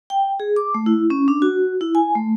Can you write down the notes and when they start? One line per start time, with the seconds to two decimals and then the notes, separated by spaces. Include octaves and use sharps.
0.10 G5
0.40 G#4
0.56 D6
0.74 A3
0.86 E4
1.10 C#4
1.28 D4
1.42 F#4
1.81 E4
1.95 G#5
2.16 A3